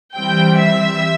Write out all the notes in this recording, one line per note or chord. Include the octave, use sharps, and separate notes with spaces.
E3 G3 C4 G5
E5